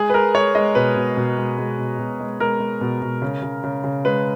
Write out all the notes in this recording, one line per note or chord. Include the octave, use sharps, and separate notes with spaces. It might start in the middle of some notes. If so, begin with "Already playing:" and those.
Already playing: G#3 G#4
B4
G#3 A#4
G#3 C#5
G#3 D#5
B2 B4
B2
B2
G#3
G#3
B2
B2
G#3
G#3 A#4
G#3
B2
B2
C#3
C#3
C#3
C#3
G#3 B4